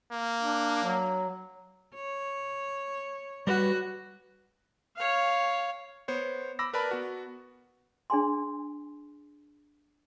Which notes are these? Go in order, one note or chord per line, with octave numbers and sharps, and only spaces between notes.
A#3
D4
F#3
C#5
G3 F#4 B4
C#5 F5
B3 C5 C#5
B5 D6 E6 A#6
A#4 B4 D5 A5 B5
B3 F#4
D4 G#4 G#5 C6